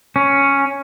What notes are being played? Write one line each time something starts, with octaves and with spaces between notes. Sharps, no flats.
C#4